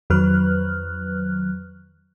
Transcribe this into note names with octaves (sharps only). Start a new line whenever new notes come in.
F2 D#3 F#3 B4 F6 F#6